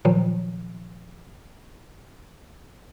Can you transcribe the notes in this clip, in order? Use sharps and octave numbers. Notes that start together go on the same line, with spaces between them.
A#2 D#3 F3 F#3